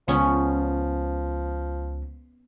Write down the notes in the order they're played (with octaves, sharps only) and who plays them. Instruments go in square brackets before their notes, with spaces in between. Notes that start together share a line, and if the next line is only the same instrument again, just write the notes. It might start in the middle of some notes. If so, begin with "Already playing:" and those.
[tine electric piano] C#2 [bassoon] F3 [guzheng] B3 C#4